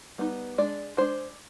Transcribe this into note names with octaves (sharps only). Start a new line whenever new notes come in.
G3 B3 D#4
G#3 D4 D5
G#3 D4 C5